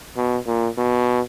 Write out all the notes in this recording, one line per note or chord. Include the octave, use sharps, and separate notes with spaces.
B2
A#2
B2